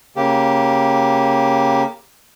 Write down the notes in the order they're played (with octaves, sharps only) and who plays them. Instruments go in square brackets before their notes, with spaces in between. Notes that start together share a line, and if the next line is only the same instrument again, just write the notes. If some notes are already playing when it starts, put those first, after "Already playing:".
[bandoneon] C#3 A#3 G4